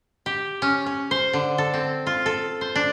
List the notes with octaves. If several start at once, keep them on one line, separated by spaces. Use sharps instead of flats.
G4
C#4
C#4
C5
D3
A4
C4
F4
A4
C5
D4